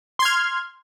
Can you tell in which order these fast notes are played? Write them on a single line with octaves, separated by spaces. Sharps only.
C6 G#6 F6